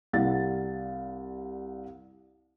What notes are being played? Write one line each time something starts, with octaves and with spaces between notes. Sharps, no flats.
C2 G3 F5 F#5 A6